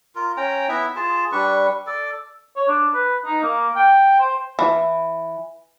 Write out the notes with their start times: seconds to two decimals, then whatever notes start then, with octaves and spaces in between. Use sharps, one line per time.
0.15 F4 A#4
0.37 C#4 G5 A#5
0.69 B3 E4 E5
0.96 F4 G#4 A5
1.32 G3 D4 B4 C#6
1.87 A4 D5
2.56 C#5
2.68 D4
2.94 B4
3.25 D#4
3.43 A#3
3.76 G5
4.19 C5
4.59 E3